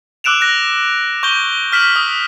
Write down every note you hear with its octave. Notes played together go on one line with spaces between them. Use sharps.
D6 E6 F#6 D7 E7 F7
F#6 A#6
C#6 G6 G7
F6 B6 E7 F#7
D#6